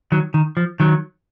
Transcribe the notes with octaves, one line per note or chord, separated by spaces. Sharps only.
D#3 F#3
D#3
F3
D#3 F#3